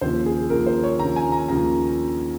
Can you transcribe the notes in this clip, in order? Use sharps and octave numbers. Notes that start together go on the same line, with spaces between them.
D#2 C#3 F3 C5
G#4
D#2 C#3 F3 A#4
C5
C#5
D#2 C#3 F3 A#5
G#5
A#5
D#2 C#3 F3 A#5